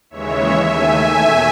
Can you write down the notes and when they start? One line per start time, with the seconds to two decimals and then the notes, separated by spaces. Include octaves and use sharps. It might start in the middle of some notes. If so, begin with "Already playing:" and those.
0.10 D#2 C#3 E3 G#3 C#5 E5
0.62 D#2 D#3 A3 E5 G#5
1.13 E2 B2 A3